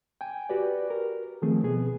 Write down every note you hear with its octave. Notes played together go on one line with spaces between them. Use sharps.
G5 G#5
F#4 G4 B4 D5
A#4
D#3 F3 A3 C4 G#4
B2 B3 G#4